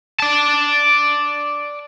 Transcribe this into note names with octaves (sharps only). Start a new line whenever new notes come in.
D5 A5